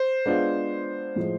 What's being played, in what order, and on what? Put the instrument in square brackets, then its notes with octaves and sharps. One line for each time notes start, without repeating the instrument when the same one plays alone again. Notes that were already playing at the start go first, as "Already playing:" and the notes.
Already playing: [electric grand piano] C5
[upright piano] G#3 B3 D4 F4
A2 F3 G#3